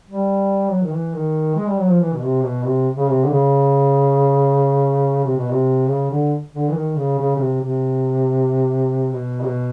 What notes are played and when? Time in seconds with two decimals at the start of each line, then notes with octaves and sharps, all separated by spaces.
0.06 G3
0.71 F#3
0.83 D#3
0.92 E3
1.14 D#3
1.56 G#3
1.67 G3
1.78 F#3
1.89 F3
2.00 E3
2.13 B2
2.22 C3
2.43 B2
2.65 C3
2.97 C#3
3.08 C3
3.25 D3
3.30 C#3
5.24 C3
5.37 B2
5.50 C3
5.89 C#3
6.10 D3
6.54 D3
6.68 E3
6.75 D#3
6.97 C#3
7.18 C#3
7.36 C#3
7.40 C3
7.62 C3
9.13 B2
9.41 C3
9.45 B2